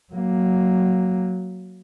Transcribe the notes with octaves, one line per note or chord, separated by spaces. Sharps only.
F#3 A#3